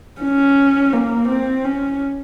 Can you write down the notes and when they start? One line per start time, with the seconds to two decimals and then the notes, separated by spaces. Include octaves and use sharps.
0.21 C#4
0.92 A#3
1.28 C4
1.64 C#4